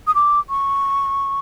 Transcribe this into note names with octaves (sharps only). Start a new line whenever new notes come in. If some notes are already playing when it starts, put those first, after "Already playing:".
D#6
D6
C#6